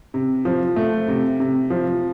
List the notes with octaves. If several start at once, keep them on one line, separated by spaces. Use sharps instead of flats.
C3
F3
A3
C3
C3
F3